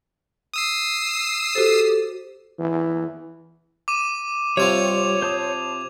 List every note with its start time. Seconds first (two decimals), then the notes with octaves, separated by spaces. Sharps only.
0.54 D#6 E6 C7
1.55 F#4 G4 A4 C5
2.59 E3
3.88 D6 D#7 E7
4.57 C3 G3 C4 F4 C#5 G#6 F7
5.22 C5 A5 D#6